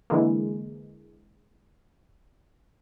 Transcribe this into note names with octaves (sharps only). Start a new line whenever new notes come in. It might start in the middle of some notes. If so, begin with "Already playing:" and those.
D3 E3 G#3 A#3